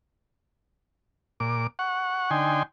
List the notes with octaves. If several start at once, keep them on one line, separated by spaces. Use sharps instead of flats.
A#2 D6
F#5 C#6
D3 D#4 G5 G#5 C6